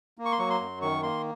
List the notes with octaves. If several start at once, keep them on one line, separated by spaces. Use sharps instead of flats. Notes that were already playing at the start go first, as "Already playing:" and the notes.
A#3
C#6
C6
F#3 C#6
C6
F#2
D#3 C#6
A#3 C6